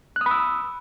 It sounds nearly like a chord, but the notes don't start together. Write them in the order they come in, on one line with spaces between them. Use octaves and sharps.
F#6 D#6 B5 E6